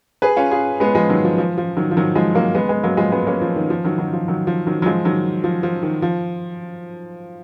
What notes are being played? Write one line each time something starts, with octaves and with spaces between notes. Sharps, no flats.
G#4 B4
C#4 F4
F4 G#4
G#3 B3
F3 G#3
D#3 F#3
F3
F3
F3
D#3 F#3
F3
D#3 F#3
F3 G#3
F#3 A#3
G#3 B3
G#3 B3
F#3 A#3
F3 G#3
G#3 B3
A#3 C#4
F3
D#3
F3
D#3 F#3
D#3 F#3
F3
D#3 F#3
F3
D#3 F#3
F#3
F3 G#3
D#3 F#3
F3
F3
D#3
F3